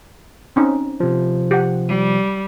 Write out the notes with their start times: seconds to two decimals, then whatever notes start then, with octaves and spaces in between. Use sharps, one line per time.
0.56 C4 C#4 D#4
1.00 C3 F3
1.51 G4 F#5
1.88 G3